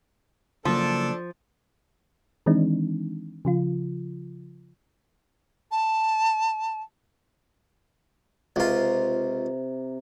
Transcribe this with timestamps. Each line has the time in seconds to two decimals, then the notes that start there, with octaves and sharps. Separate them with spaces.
0.65 C#3 F3 F#3 A#3 D4 A4
2.46 D#3 E3 G#3 C4 D4 D#4
3.45 C#3 F3 F4
5.71 A5
8.56 C#2 C3 F4 A#5